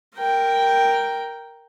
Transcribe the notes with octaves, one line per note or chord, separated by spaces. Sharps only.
A#4 G5